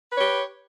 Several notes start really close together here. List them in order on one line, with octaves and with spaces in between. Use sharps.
B4 C#5 G4